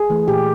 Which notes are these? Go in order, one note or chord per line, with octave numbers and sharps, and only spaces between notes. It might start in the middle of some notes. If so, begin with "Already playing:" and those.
Already playing: G#4
E3 A3
A#2 G4